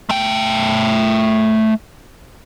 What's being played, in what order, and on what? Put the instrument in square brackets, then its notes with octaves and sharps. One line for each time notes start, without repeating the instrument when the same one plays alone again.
[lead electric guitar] A3 G5